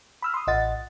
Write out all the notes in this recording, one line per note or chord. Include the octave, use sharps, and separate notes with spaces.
B5 E6 F6
C6 D#6
A1 D#5 F#5 A6